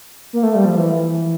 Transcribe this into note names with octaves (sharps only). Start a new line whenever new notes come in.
A#3
A3
G3
F3
E3